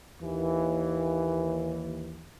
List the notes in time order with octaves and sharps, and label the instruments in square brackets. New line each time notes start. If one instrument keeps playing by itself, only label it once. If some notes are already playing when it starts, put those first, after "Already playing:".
[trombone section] D#2 E3